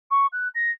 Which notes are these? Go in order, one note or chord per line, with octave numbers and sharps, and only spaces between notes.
C#6
F#6
A#6